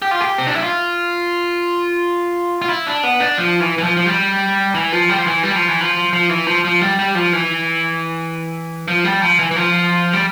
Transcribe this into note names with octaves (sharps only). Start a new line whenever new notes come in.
G4
F4
G4
C4
D4
E4
F4
F4
E4
D4
B3
D4
F3
E3
E3
F3
F3
G3
E3
F3
G3
F3
E3
G3
F3
E3
F3
F3
E3
F3
F3
G3
G3
F3
E3
F3
G3
F3
E3
E3
F3
G3